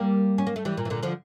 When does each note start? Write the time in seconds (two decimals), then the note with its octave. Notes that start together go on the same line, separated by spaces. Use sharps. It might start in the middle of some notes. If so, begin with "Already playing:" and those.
Already playing: G3 A#3
0.38 C#4
0.47 A#3
0.56 A3
0.65 E3 G3
0.77 A#2
0.85 E3
0.90 A#2 D3
1.03 D3 F3